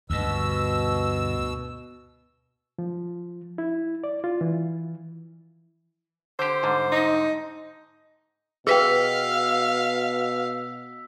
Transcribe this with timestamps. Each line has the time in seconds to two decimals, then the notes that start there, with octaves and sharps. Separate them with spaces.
0.10 D2 G2 B2 E6
2.79 F3
3.58 E4
4.04 D5
4.24 F4
4.41 E3
6.39 D3 G4 C5
6.63 G#2 D3 G3
6.92 D#4
8.67 B2 G#4 B4 F5 G5 E6 B6